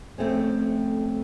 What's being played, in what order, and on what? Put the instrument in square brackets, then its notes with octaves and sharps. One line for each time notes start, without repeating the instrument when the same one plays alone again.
[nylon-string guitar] F2 A3 C4 C#4